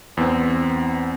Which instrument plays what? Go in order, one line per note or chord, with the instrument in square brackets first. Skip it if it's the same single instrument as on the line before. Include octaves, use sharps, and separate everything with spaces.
[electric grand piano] E2 B3 C4